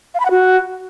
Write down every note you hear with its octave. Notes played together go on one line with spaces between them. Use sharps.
F5
B5
F#5
F#4